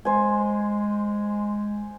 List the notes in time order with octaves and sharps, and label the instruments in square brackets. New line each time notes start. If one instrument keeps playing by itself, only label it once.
[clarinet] G#3 [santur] C5 G#5